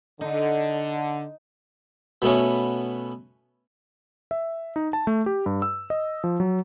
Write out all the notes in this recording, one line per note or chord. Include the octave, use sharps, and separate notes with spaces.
D3 D#4
B2 A3 B3 C#4
E5
D#4
A5
A3
G4
G2
E6
D#5
F3
F#3